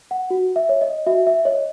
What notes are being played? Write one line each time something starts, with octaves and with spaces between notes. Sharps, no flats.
F#5
F#4
E5
C#5
D#5
F#4 E5
E5
C#5 D#5